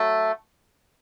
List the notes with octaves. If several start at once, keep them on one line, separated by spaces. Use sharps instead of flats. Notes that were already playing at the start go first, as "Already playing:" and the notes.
Already playing: F#3 A3